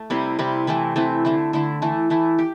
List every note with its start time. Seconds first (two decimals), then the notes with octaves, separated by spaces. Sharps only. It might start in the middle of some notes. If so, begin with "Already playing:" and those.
Already playing: A3
0.10 C3 G3 C4 E4
0.39 C3 G3 C4 E4
0.67 E3 A3 C4 E4
0.96 E3 A3 C4 E4
1.25 D3 A3 E4
1.53 D3 A3 E4
1.82 E3 A3 E4
2.10 E3 A3 E4
2.39 G4